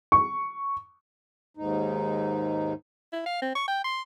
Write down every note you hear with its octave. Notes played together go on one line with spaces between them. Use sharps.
C#6
D#2 G#2 D#4
E4
F5
C4
C#6
G5
C6